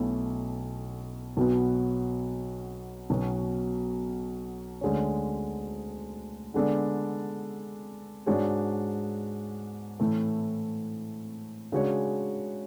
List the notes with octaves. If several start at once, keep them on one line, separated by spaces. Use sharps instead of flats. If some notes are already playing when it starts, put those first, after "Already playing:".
Already playing: B1 B2 A3 C#4 E4
B1 B2 F#3 B3 F#4
B1 B2 F#3 C#4 F#4
D2 D3 G#3 C#4
D3 G#3 B3 D4 A4
G#2 G#3 D4 F#4 C#5
A2 E3 A3
C#3 G#3 D4 F#4 C#5